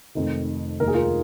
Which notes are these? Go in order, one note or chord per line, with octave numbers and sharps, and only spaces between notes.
F1 F2 D#3
F1 D#2 D#3 A#4
G#4
F4 A#4